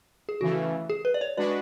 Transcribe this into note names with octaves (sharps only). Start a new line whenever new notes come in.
G#4
C#3 E3 A3 F#4
G#4
B4
D5
C#5
G#3 D4 F#4 B4 D5